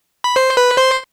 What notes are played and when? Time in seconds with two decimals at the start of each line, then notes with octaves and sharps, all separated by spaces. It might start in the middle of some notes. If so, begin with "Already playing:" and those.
0.24 B5
0.36 C5 C6
0.56 B4 B5
0.77 C5 C6